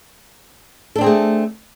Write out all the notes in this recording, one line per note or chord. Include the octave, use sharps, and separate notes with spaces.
A3 C4 D4 G#4 A4